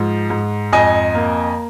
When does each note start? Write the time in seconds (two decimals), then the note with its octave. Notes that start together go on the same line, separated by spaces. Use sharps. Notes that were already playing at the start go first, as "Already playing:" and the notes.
Already playing: G#2 F3
0.30 G#2
0.73 F2 D#5 G#5
1.15 A#3